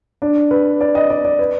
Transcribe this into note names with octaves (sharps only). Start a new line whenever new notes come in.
D4
B4
D5
D#5
D5
D5
B4